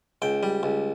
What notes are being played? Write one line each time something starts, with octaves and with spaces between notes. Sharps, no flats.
C#2 G5
G3
C#2